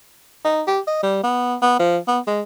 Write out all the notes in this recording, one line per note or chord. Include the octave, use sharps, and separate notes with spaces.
D#4
G4
D#5
G3
B3
B3
F3
B3
G#3